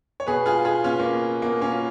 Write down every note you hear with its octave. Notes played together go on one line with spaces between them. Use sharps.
C#5
B2 G#4 B4
F4 G#4
F4 G#4
B2 C#4 F4
A#3 C#4
B2 A#3
A#3 C#4
F4